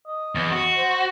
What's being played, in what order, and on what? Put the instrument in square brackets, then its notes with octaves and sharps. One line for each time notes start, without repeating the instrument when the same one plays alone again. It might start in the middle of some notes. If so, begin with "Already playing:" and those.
[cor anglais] D#5
[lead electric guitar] E2
F#4
[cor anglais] C5